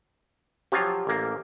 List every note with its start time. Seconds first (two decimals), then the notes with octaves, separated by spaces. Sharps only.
0.72 F3 F#3 F4 G4 E6
1.07 A1 A#3